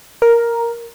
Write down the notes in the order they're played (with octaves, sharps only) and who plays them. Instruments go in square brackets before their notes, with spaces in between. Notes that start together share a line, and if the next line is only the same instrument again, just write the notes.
[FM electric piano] A#4